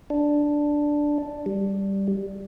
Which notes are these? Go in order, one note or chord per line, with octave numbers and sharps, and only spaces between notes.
D4
G3